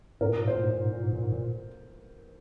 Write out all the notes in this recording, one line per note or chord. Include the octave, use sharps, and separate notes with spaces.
G#2 A#4
A#2
G#2
A#2 C5
G#2
A#2
G#2
A#2
G#2
A#2
G#2
A#2